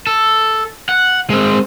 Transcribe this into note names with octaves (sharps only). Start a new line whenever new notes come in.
A4
F#5
G#3 C4